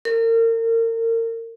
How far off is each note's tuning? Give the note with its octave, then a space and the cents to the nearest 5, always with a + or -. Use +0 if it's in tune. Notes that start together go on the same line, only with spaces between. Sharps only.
A#4 -35